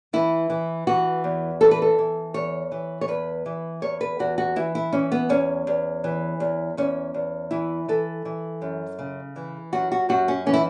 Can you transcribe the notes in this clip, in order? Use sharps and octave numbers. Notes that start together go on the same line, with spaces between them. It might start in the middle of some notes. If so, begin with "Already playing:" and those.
E3 E4
E3
E3 F#4
E2
E3 A4
B4
A4
E3
E2 C#5
E3
C#5
E2 B4
E3
E2 C#5
B4
E2 F#4
F#4
E3 E4
E4
E3 C#4
B3
E2 C#4
E2
E3
E2
E2 C#4
E2
E3 E4
E3 A4
E3
F#2
C#3
E3
F#2 F#4
F#4
F#2 F#4
C#4
E3 C#4
E4